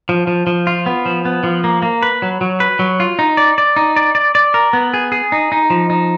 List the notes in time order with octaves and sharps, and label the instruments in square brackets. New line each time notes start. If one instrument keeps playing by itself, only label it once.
[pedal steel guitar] F3
F3
F3
F4
B3
F3
B3
F3
A#3
A#3
B4
F#3
F#3
B4
F#3
F4
D#4
D5
D5
D#4
D5
D5
D5
A#4
B3
G#4
G#4
D#4
D#4
F3
D#4